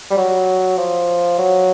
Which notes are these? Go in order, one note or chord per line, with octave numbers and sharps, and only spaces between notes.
G3
F#3
F3
F#3